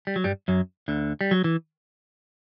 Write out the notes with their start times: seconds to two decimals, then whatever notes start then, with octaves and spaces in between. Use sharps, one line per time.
0.07 G3
0.16 F#3
0.24 G2 G3
0.48 F#2 F#3
0.88 D2 D3
1.21 G3
1.31 F#3
1.44 E3